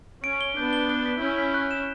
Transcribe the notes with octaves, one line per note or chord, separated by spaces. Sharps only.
C#4 D7
G7
B3 D4 G6
G7
G7
B6
C#4 E4 G6
B6
F#6
E7